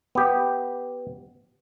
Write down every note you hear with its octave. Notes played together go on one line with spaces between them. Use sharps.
B3 G4